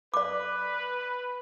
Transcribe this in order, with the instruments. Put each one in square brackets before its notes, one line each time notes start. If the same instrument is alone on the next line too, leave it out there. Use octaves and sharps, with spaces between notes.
[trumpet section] B4 [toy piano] D5 D6